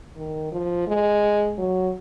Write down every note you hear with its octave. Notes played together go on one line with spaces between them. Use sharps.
D#3
F3
G#3
F#3